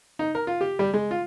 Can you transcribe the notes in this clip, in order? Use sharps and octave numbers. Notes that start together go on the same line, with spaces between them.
D#4
A#4
F4
G4
G3
G#3
F4